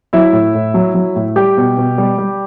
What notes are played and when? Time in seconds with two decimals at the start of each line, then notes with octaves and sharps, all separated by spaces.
0.13 F#3 E4 E5
0.33 A2
0.54 A2
0.74 F#3
0.94 F#3
1.16 A2
1.36 G3 G4 G5
1.57 B2
1.78 B2
1.98 G3
2.18 G3